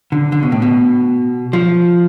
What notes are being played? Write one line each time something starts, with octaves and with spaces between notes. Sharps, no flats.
D3
D3
B2
A2
B2
F3